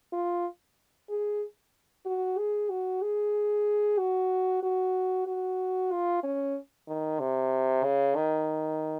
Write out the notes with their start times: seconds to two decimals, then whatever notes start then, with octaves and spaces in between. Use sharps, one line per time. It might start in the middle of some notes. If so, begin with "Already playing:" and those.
0.13 F4
1.10 G#4
2.06 F#4
2.38 G#4
2.70 F#4
3.02 G#4
3.98 F#4
4.63 F#4
5.27 F#4
5.92 F4
6.23 C#4
6.88 D#3
7.20 C3
7.84 C#3
8.16 D#3